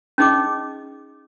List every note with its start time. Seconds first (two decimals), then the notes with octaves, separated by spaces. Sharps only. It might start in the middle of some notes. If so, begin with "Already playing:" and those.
0.18 C#4 D#4 G#4 D#5 D6